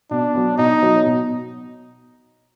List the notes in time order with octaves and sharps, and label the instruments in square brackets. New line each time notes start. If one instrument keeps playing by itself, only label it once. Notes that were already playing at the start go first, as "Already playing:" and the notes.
[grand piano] B2 [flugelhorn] D4
[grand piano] F#3 B3
[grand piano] B2 [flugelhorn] D#4
[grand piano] F#3 B3
B2